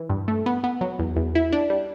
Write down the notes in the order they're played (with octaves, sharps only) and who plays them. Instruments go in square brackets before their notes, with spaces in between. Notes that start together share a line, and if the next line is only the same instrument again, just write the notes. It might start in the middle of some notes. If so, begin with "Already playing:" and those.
Already playing: [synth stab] E3
G2
A3
B3
B3
F#3
E2
E2
E4
D4
G3